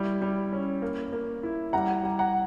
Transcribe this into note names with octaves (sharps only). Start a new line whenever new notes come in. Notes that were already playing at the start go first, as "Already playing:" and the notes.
Already playing: G3 E4 B5
G3
C#4
A#3
A#3
E4
G3 F#5 A#5
G3
F#5 A#5